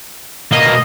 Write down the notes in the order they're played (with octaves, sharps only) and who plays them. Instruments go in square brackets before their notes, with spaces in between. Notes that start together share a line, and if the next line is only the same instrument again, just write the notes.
[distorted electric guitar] B2 A#3 [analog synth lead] D#5